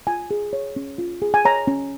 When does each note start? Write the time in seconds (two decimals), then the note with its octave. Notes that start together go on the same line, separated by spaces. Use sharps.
0.07 F4 G#5
0.31 G#4
0.53 C#5
0.76 C#4
0.98 F4
1.22 G#4
1.34 G#5
1.45 C#5 A#5
1.67 C#4